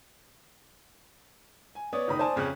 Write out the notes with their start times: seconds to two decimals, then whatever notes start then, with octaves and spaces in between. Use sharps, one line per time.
1.75 G#5
1.93 B3 C#5 D5 D#6
2.08 F#1 D#3 B5 D#6
2.19 C5 D5 G#5 A5
2.36 F2 C#3 C#4 F#6